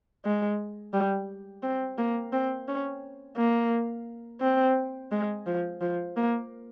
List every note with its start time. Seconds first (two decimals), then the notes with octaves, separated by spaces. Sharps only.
0.25 G#3
0.93 G3
1.63 C4
1.98 A#3
2.33 C4
2.68 C#4
3.37 A#3
4.41 C4
5.12 G#3
5.47 F3
5.81 F3
6.16 A#3